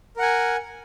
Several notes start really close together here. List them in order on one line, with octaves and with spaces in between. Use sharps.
A#4 F#5 G#5